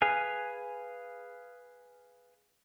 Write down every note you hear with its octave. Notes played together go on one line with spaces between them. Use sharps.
G#4 B4 F5 G#5